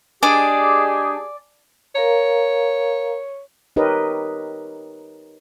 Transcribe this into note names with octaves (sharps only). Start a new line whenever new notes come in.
G#3 D4 G4 G#4 D5 G#5
A#4 C#5 F5 A#5
D#4 G4 A#4 B4 C#5 D#5